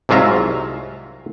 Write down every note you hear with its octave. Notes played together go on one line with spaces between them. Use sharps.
C2 G#2 F#3 F4 E5 A#5